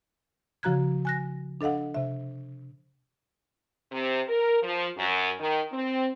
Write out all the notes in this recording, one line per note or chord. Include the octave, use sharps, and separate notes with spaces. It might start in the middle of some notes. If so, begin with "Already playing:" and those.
C#3 F3 F#4 A#5 F#6 G#6
G#5 F#6 A#6
D4 A4 D#5 F5 F#5
C3 E5
C3
A#4
F3
F#2
D#3
C4